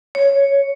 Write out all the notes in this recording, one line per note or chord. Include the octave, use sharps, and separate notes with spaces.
C#5